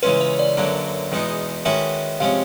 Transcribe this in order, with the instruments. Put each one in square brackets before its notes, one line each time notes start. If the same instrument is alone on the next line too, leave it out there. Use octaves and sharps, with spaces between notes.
[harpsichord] C#3 E3 G#3 C#4 F4 [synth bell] B4
[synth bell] C#5
D5
[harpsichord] F#2 D3 F#3 A#3 D4
E2 B2 G#3 B3 D#4
[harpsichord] D#3 G#3 C#4 F#4 B4 [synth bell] E5
[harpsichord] C3 F3 G#3 C#4 [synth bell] F5